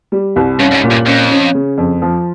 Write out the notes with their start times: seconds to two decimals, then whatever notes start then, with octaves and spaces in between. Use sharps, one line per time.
0.12 G3
0.36 C2
0.60 G2 C#4
0.72 G2
0.75 G#2
0.84 A#2
0.91 G2
1.06 F2 C#4
1.31 C#4
1.54 C#3
1.78 F2
2.02 F3